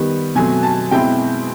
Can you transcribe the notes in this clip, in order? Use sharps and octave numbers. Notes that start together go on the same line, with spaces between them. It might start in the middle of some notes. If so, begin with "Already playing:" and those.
Already playing: D#3 G3 B3
B2 F#3 A3 C4 G#5
A5
B2 G#3 C4 E4 G5